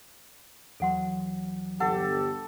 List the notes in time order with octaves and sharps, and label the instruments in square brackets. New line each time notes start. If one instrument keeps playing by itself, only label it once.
[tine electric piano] D#2 E3 F#3 [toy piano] A4 F#5 C6
[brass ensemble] G1 G4 [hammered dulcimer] A4 [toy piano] F#5